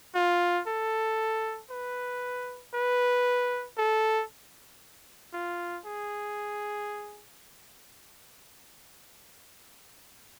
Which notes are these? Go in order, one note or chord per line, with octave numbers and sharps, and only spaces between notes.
F4
A4
B4
B4
A4
F4
G#4